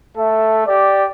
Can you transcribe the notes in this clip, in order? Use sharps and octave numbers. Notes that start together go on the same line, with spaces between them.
A3 A4 E5
G4 D5